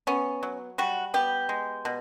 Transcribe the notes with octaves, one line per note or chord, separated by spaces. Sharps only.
B3 C#4
F#3
G3 F#4
B3 G4
G#3
B2